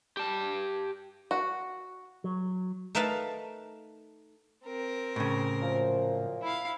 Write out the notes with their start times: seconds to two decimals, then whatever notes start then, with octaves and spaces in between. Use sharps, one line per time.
0.17 G4 A5
1.31 F#4
2.24 F#3
2.95 A3 D#4 A#4 B4 F5 A5
4.66 C4 A#4
5.16 A2 C#3
5.61 F#2 A#2 F3
6.42 E4 F5